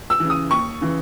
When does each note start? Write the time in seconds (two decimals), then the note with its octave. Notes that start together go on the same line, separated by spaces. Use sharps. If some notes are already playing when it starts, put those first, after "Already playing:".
0.10 E6
0.20 C#3 E3
0.30 D#6
0.50 D#2 C#6
0.81 C#3 E3